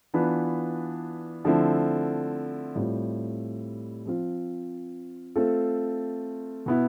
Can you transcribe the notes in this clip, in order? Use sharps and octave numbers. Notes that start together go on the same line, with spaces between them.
E3 B3 D4 F4 B4
D3 F3 A3 C4 E4
A2 G3 C4 F4
F3 C4 F4
A3 C4 F4 A4
B2 B3 E4